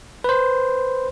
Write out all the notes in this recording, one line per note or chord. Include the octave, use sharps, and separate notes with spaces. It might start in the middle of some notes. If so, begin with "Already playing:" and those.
B4 C5